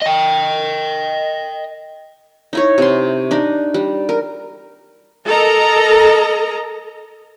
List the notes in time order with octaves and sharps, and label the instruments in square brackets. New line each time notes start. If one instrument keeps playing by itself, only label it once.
[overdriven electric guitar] D#5 G5
[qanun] D#4 E4 C#5
C3 C6
D4 D#4
G3
A#4
[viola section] A4 A#4 D#5 A#5